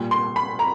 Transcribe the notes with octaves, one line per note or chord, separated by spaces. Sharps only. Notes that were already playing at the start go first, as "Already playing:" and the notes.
Already playing: A#2 G3
C6
B5
A#5